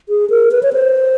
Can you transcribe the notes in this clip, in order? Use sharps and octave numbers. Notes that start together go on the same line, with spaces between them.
G#4
A#4
B4
C#5
C5